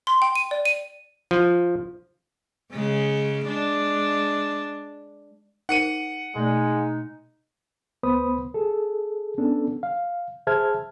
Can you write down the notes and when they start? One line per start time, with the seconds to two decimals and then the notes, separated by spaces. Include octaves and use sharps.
0.07 C6
0.22 G5
0.35 D#7
0.51 D5
0.65 D#7
1.31 F3
2.74 C#3 G#3
3.45 G#3 D4
5.69 D#4 A#4 C5 F#5 C#7 D#7
6.35 B2 G#3 A3 D#4 D5
8.03 D2 B3 B4 C5 B5 D#6
8.54 G#4 A4
9.38 B3 C#4 D4 A4
9.83 F5
10.47 G#4 C5 E5 A5 F6 G#6